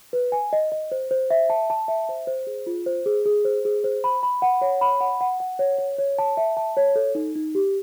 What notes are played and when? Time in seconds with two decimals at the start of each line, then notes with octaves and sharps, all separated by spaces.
0.13 B4
0.32 G#5
0.53 D#5
0.72 D#5
0.92 C5
1.11 C5
1.30 E5
1.50 A5
1.70 A5
1.88 E5
2.09 C5
2.27 C5
2.47 G#4
2.67 F4
2.86 C5
3.06 G#4
3.26 G#4
3.45 C5
3.65 G#4
3.84 C5
4.04 B5
4.23 B5
4.42 F#5
4.61 C#5
4.81 B5
5.01 F#5
5.21 F#5
5.40 F#5
5.59 C#5
5.79 C#5
5.99 C#5
6.19 A5
6.37 E5
6.57 A5
6.77 C#5
6.96 A4
7.15 D#4
7.36 D#4
7.55 G4